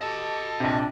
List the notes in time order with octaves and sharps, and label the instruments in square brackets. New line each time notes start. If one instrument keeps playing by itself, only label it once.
[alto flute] G4 [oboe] A4 [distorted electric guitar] D#5 A5
[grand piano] A#1 C3 [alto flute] D4